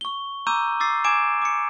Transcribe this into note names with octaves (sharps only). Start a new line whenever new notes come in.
C#6 G7
A#5 C#6 D6 E6 G6 D#7
D6 E6 A6 C7
G#5 D6 G#6 D7 E7
D6 C#7